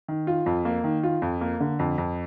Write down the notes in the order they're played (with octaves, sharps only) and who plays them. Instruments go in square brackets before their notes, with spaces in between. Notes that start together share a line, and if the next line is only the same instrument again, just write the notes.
[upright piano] D#3
F4
F2
A#3
D#3
F4
F2
A#3
D3
F2
F2